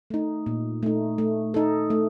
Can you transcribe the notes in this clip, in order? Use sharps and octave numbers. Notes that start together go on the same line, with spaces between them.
A3 D#4
A#2
A3 D#4
A3
D#4 A4
A3